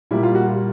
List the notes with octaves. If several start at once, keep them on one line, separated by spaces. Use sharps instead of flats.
A#2 G3 A#3 E4
F4
F#4
F4